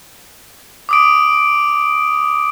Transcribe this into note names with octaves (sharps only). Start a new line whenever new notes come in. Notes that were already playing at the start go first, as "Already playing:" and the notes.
D6 D#6 D7